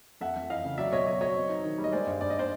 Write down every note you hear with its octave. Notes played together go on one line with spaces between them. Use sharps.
F2 E5 F#5
F2
E3 D#5 F5
C#3
F#3 D5 E5
B2 C#5 D#5
F#3 C#5 D#5
F#3 C#5 D#5
C4
D#4
D#3
G3
D#5
G#3 C5 D5
G2
G2 D5
D#5
C5 D5